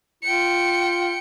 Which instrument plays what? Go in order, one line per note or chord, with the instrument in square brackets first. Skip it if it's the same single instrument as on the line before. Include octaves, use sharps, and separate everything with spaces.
[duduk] F4 [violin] G5 C#7